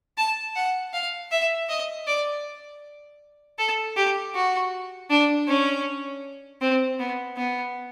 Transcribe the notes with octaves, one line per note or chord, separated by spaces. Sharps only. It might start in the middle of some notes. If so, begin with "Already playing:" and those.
A5
F#5
F5
E5
D#5
D5
A4
G4
F#4
D4
C#4
C4
B3
B3